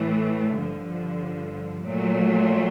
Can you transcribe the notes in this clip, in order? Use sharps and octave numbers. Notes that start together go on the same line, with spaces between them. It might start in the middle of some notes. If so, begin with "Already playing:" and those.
Already playing: A2 E3 A3
G2 D3 F3
A#2 F#3 A3